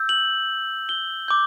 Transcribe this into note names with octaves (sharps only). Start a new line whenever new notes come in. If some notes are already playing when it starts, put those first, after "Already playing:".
Already playing: E6 G6
F#7
G7
D6 G6